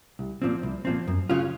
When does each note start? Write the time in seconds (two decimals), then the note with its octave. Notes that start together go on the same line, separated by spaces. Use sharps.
0.19 C2
0.42 A#2 F3 C4
0.63 C2
0.85 A#2 F3 C4
1.07 F#2
1.29 C#3 F#3 C#4 F4